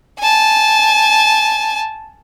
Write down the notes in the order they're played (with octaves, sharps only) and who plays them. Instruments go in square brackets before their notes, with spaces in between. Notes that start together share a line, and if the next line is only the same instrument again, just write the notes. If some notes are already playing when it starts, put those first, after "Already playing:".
[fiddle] G#5 A5